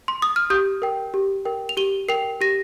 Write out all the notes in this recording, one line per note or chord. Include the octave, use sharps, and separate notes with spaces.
C6
D#6
F6
G4 D#6 G6
A#4 G5
G4
A#4 G5
F7
G4 D#7 G7
A#4 G5 C7 F7
G4 A#6 D#7